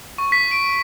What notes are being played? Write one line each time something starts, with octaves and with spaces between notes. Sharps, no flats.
C#6
B6
D7